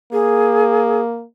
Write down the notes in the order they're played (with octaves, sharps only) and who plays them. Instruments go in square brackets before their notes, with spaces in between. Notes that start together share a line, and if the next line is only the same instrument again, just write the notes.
[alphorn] A#3 [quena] G#4